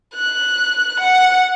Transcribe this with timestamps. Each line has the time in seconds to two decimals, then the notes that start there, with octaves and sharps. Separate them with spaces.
0.15 F#6
1.00 F#5